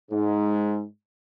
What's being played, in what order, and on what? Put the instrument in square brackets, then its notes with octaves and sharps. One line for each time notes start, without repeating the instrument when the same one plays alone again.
[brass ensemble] G#2